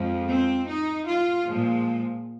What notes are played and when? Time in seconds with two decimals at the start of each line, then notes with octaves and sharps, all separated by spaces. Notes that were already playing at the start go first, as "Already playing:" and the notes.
Already playing: F2 F3 G#3
0.29 C4
0.67 D#4
1.06 F4
1.46 A#2 F3 G#3